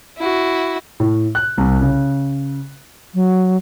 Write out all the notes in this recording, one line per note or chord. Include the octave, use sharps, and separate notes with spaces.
E4 F#4
A2
F#6
C2
C#3
F#3